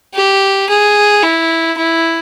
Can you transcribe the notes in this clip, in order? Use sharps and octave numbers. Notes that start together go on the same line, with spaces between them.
G4
G#4
E4
E4